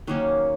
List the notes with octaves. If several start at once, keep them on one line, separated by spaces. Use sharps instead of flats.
D#3 F#3 A#3 C#4